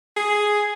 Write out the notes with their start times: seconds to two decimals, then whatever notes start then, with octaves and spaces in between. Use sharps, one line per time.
0.17 G#4